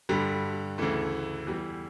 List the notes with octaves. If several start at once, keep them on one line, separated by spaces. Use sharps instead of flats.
G2 D3 G3
D2 C#3 E3 A3
E2 E3 G3